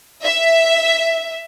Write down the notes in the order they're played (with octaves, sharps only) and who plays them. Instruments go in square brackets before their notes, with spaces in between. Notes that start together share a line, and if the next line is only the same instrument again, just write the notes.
[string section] E5